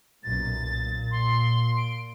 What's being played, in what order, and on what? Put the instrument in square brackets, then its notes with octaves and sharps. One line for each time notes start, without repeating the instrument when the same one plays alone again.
[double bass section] B1 F#2 A#2 [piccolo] A6
[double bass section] A#2
[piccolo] C6
D7